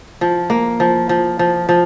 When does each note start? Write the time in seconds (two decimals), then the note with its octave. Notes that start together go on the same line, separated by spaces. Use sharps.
0.21 F3
0.50 A#3
0.80 F3
1.09 F3
1.39 F3
1.69 F3